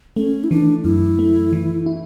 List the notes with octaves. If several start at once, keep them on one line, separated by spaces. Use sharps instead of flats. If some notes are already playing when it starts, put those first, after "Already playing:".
A3 C#4
E4
E3 D4
F#2 E4
A3
E3
E4